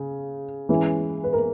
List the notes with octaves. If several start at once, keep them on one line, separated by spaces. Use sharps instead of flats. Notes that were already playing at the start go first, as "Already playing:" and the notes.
Already playing: C#3
E3 G#3 C#4 E4
B4
A#4